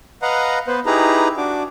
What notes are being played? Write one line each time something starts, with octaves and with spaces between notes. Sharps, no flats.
B4 D#5 F5 F#5 A#5
B3 B4 C5
D#4 E4 G4 G#4 B4 A#5
D4 F#4 D6